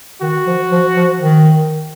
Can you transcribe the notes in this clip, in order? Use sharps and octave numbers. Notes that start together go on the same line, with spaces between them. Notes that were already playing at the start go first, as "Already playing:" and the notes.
D#3 F#4
F3
F3
F3
D#3